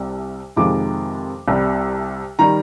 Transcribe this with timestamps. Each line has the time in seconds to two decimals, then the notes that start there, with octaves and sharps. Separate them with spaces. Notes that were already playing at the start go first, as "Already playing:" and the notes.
Already playing: C2 C3 G3
0.56 F2 C3 D#3 G#3 D6
1.48 C2 C3 G3
2.39 D#3 G3 A#5